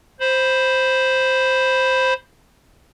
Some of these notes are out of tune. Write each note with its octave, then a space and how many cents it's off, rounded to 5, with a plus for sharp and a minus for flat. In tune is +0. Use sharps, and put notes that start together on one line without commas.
C5 +0 B5 +0